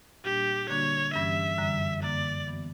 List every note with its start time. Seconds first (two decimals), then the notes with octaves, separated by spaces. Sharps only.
0.24 A#2 G3 A#3 D4 G4
0.69 D3 G3 A#3 D4 F#4 C#5
1.14 G2 E3 G3 C#4 G4 E5
1.58 F#2 D3 G3
2.02 F#2 D3 A#3 D5
2.47 E3 B3 F#4